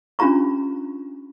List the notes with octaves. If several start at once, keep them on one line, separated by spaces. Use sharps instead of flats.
C#4 D4 F4 G4 A#5 C#6